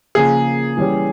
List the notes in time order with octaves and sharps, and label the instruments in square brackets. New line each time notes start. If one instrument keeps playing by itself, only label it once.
[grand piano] C#3 F3 A#3 [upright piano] G#4
[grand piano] E3 G3 C#4 G4